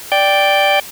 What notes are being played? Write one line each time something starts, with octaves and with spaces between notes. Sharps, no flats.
D5 G5